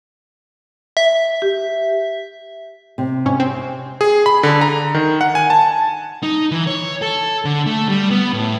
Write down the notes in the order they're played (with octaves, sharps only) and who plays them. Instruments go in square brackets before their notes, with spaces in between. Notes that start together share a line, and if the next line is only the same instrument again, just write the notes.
[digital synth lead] E5
[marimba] G4
[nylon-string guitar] C3
[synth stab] G#2 C#4
C4
[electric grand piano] G#4
B5
D3
A#5
D#3
F#5
G#5
A5
[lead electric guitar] D#4
E3
C#5
A4
D3
A3
G3
B3
A2